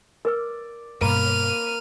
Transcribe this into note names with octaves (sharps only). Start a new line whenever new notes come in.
A#4 B4 D5 E6
G2 B2 A#3 B4 B5 C6 F6 D#7